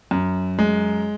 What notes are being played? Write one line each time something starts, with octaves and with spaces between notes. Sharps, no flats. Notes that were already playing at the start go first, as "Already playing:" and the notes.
F#2
G#3